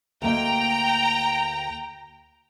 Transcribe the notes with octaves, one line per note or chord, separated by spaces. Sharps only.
D2 A#3 D#5 G5 A#5